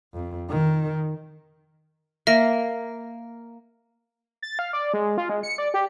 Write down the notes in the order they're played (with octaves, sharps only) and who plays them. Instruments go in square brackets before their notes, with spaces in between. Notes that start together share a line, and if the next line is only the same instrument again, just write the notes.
[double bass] F2
D#3
[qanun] A#3 [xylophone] E5 A#6
[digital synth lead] A6
F5
D5
G#3
F4
G#3
C#7
D5
G4